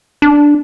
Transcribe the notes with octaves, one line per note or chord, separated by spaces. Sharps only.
D4